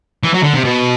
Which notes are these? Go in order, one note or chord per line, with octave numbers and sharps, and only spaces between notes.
E3
F#3
D3
C3
B2